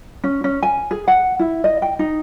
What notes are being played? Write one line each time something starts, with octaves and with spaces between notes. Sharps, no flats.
C#4
C#4
G#5
G#4
F#5
E4
D#5
G5
D#4